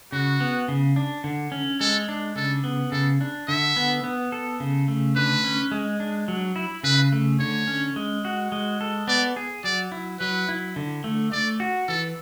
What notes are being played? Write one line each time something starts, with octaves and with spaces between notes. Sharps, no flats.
C#3 F#4
B3
C#3
D4
D3
C#4
G#3 A4
D4
C#3 A4
B3
C#3 A4
D4
D3 E5
B3
B3
A4
C#3
A3
D3 B4
C#4
G#3
D4
F#3
E4
C#3 B4
A3
D3 C#5
C#4
G#3
F#4
G#3
A4
B3 D5
G#4
F#3 D5
E4
F#3 B4
E4
D3
A3
A3 D5
F#4
E3 A4